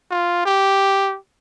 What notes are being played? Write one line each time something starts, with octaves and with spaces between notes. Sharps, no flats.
F4
G4